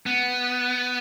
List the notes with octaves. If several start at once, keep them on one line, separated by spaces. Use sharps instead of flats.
B3